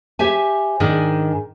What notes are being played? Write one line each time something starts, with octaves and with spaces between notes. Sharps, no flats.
G4 C5 E5 G#5
G#2 D#3 D4 G#4